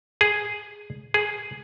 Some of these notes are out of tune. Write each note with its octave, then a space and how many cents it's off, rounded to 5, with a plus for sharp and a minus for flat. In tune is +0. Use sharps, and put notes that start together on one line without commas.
G#4 +0
G#4 +5